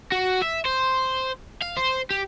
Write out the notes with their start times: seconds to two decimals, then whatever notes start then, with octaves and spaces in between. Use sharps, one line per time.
0.12 F#4
0.42 E5
0.65 C5
1.62 F5
1.77 C5
2.11 G4